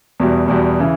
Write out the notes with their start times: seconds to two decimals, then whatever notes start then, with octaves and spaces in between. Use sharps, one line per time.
0.20 E2 B2 G3
0.48 E2 B2 G3
0.80 C#3 E3